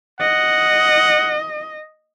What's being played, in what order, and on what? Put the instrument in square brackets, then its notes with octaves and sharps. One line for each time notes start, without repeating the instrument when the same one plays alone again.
[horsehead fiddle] D#5 [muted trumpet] F#5